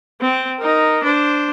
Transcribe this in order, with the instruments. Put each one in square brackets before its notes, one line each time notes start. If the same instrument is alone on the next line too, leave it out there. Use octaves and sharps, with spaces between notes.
[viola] C4
D#4 A#4
D4 C5